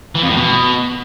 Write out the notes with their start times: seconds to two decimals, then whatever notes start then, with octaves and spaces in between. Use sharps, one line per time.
0.15 E3
0.22 F2
0.29 A2
0.37 B2